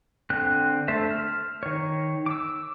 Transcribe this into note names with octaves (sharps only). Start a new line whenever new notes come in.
D3 C4 F#6
A3 A4 C5 E5
F6
D#3 C#5
D6 E6